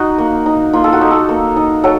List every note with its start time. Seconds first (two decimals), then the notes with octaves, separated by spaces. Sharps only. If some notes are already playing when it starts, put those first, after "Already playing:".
Already playing: D#4 F#4
0.18 A#3
0.46 D#4
0.73 A#3 F4
0.84 A4
0.93 F#4
1.01 D#4
1.11 A4
1.29 A#3
1.56 D#4
1.84 F#3 A4